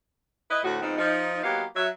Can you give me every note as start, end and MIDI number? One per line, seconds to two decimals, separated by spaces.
0.51 0.60 64
0.51 0.60 71
0.51 0.60 75
0.63 0.77 38
0.63 0.77 45
0.63 0.77 66
0.81 0.95 44
0.81 0.95 53
0.81 0.95 59
0.81 0.95 60
0.81 0.95 63
0.98 1.43 53
0.98 1.43 63
1.43 1.64 54
1.43 1.64 58
1.43 1.64 59
1.43 1.64 63
1.43 1.64 67
1.43 1.64 77
1.76 1.87 54
1.76 1.87 76